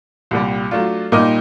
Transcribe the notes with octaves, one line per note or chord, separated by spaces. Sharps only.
C2 A#2 G3
F#3 A3 D4 F4
A#2 G3 A#3 D#4